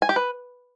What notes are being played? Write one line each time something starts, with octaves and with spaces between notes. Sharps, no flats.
G#5
G4
B4